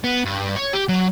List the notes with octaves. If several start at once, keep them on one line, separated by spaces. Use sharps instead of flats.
B3
G2
C#5
G4
F#3